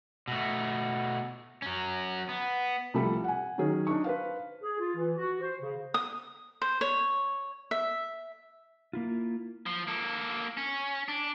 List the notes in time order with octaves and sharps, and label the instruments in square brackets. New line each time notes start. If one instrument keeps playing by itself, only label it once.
[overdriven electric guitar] B2 A3
F#3 C#4
B3
[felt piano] C2 F3 G3 A3 B5
F#5 G#5
D#3 F#3 C#4 G#4
D4 D#4 C#6
B4 C5 F5
[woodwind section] G#4
F4
E3
F#4
C5
C#3
[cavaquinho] D#6
C5
C#5
E5
[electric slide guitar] A#3 E4 F4
[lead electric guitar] F3
A#3 A4
C#4
D4